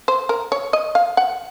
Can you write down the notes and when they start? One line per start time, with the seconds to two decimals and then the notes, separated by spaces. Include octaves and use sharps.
0.08 C5
0.29 A#4
0.52 C#5
0.73 D#5
0.95 F5
1.17 F#5